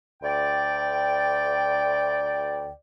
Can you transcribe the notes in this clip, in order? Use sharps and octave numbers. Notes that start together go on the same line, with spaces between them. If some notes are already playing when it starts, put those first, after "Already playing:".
D2 D5 G5